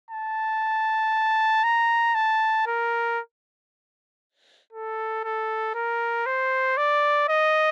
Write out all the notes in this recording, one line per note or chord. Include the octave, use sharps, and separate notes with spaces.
A5
A#5
A5
A#4
A4
A4
A#4
C5
D5
D#5